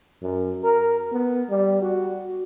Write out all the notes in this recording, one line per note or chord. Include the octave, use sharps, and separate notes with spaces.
F#2
A#4
B3
G3
F#4